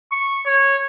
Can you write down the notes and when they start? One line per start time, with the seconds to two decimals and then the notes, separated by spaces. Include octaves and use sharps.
0.12 C#6
0.46 C#5